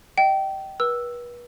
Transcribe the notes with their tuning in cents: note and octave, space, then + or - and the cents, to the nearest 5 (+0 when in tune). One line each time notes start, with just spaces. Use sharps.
D#5 +0 G5 -25
B4 -35 E6 +0